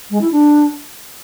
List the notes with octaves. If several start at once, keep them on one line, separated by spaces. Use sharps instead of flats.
G#3
E4
D4